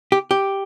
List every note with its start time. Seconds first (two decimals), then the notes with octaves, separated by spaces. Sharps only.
0.12 G4
0.31 G4